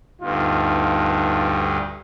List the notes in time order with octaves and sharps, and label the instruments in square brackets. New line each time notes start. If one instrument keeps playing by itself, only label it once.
[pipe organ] D2 G2 [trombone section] B3 D#4 F4